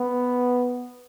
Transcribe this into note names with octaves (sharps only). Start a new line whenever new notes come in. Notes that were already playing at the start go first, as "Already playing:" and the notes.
Already playing: B3